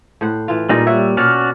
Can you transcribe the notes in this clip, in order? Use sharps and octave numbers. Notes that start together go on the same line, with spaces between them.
A2 C5 F#5
E3 F4
A#2 G3 D#4 G#4 D5 F5
G3 F#4 C#5 E5
B2 C#4 F#4 C#5 D5 F6